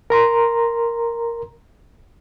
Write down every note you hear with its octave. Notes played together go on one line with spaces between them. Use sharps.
A#4 A#5 C6